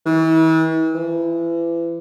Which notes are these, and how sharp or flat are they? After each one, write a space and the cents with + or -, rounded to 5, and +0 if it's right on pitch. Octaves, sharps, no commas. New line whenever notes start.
E3 -40
E3 +30